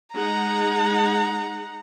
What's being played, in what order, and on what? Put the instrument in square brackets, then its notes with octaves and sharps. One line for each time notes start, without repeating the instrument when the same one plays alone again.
[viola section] G#3 D#4 F#5 [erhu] A#5